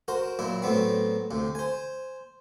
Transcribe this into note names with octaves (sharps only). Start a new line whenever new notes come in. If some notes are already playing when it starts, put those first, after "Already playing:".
F#4 A#4 C5
A#2 F#3 E4
A2 F#3 B3 C4
D2 C3
C5 G#5